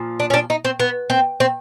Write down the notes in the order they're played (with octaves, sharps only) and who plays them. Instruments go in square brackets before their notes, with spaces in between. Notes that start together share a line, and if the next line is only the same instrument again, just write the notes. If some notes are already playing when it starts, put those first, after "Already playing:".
Already playing: [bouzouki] A#2 F3
D4
C#4
D4
D#4
C4
B3
C4
C4